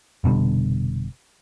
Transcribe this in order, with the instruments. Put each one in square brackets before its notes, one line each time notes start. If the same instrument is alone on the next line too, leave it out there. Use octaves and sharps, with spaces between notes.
[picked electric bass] F1 B2 D3 G3